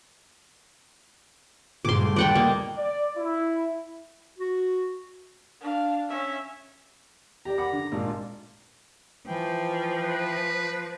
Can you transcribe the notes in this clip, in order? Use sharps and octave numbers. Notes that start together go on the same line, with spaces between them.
C#2 G2 A#2 C6 D6
G3 A3
D#2 B3 C4 D5 F#5 G5
A#3 C5 C#5 D#5
D5
E4
F#4
D4 F5
C#4 E5
G4 D5 A#5
F#5 B5 D6
D3
G#1 A#2 D4 F4
E3 F3 G5
B4